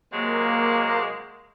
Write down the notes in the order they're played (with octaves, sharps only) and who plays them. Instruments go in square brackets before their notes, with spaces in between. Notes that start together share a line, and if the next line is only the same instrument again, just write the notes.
[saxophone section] C3 F#3 G#3 [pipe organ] A#3